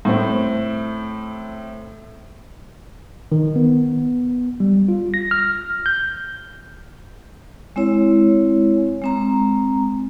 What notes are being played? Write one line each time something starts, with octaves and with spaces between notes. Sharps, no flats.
A2 C4
D#3
B3
G3
F4
A#6
F6
G6
G#3 C4 E4 C#5
G#3 C4 A#5